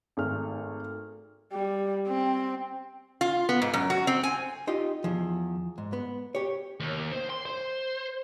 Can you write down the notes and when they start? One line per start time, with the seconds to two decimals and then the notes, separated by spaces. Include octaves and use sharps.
0.17 G#1 A3 G#4 F6
1.53 G3
2.08 C4
3.21 F4
3.49 B3
3.62 G#2
3.74 F#2
3.90 F#4
4.07 C4
4.23 G#5
4.67 D#4 F4 G4 D#5
5.04 E2 F3
5.78 G#2
5.93 B3
6.35 G4 C#5
6.80 D#2
7.12 C5
7.30 C6
7.46 C5